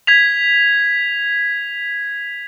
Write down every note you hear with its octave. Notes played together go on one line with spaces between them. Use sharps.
G#6 B6 F7